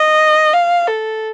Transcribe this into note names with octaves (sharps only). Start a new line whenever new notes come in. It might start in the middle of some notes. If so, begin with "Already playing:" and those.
Already playing: D#5
F5
A4